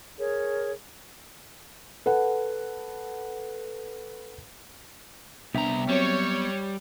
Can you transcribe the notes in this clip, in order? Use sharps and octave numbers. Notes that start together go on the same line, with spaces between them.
G#4 A#4 C#5
A4 B4 F#5
C2 B3 D4 E5 G5 A#5
F#3 G3 C4 C#5